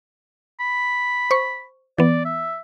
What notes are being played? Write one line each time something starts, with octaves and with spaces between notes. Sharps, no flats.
B5
C5 C#6
E3 B3 D5
E5